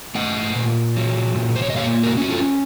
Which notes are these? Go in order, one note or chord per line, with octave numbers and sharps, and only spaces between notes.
A3 D#5 F#5
A#2
F#3
A#2
C5
C#5
D#5
A#3 C#5 F5
F#4 A#4
C#4 F#4
F4 A4